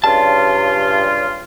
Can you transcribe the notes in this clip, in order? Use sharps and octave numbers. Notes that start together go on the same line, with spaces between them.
G2 C#3 F4 A5